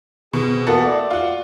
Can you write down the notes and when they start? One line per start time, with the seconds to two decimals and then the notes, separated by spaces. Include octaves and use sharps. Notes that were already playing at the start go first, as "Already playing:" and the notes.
0.33 B2 C4 G#4
0.67 E3 A#3 B3 F#4 A4
0.85 B2 A3 D5
1.10 F4 F#4